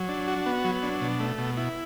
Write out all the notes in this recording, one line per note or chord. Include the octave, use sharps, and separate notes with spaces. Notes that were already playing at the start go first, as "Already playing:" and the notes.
Already playing: F#3
D4
F#4
B3
F#3
D4
B2
A3
B2
E4